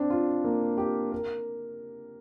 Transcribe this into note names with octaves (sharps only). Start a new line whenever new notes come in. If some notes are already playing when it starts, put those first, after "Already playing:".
Already playing: C4 D4
F4
A#3
G4
A#4